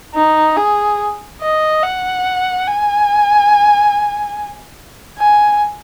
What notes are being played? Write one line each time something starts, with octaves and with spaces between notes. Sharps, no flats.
D#4
G#4
D#5
F#5
G#5
G#5